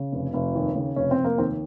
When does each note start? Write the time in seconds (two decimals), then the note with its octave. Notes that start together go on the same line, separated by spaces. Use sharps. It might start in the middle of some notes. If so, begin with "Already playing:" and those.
Already playing: C#3
0.12 F1
0.34 F1
0.55 D#2
0.75 C#3
0.96 F1 C#4
1.11 C4
1.18 F1
1.24 A#3
1.38 D#2 C4